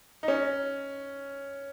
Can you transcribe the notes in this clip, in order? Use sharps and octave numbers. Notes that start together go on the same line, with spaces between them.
D#4
C#4